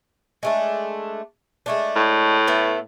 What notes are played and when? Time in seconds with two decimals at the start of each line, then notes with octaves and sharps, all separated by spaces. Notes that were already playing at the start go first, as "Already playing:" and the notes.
0.43 G#3 A3 D4
1.66 G#3 A3 D4
1.96 A2
2.47 A3 B3 A4